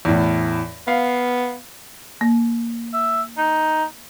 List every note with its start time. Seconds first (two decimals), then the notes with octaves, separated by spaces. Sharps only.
0.05 E2 A2
0.88 B3 F5
2.21 A#3
2.93 E5
3.38 D#4